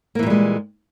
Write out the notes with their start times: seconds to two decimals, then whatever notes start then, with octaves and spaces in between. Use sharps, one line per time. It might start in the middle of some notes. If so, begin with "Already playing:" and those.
0.15 A#3
0.19 E3
0.23 A#2
0.26 G3
0.30 G#3